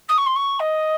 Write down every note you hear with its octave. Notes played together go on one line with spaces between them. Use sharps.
D#6
C#6
C6
C#6
D#5